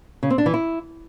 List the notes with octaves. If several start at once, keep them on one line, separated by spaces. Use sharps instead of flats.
C#3
C4
D4
E3
E4